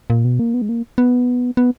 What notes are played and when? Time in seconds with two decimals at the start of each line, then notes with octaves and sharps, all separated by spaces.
0.10 A#2
0.25 B2
0.40 A#3
0.54 B3
0.62 G#3
0.69 A#3
0.98 B3
1.57 B3